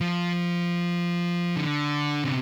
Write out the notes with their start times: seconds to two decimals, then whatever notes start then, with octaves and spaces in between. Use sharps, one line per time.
0.01 F3
1.57 D3
2.24 C3